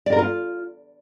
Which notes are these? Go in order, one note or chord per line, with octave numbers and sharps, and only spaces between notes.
D5
A#4
F4